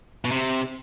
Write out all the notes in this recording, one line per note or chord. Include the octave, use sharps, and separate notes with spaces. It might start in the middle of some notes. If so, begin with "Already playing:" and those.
B2
C3